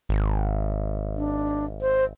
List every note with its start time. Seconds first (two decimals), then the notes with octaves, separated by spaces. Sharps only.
0.09 G#1
1.16 D4
1.82 C5